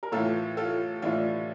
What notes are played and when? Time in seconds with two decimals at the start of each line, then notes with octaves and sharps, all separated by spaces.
0.03 A#4
0.12 A2 E3 F4 A4
0.57 F4 A4
1.02 A2 E3 D4 F4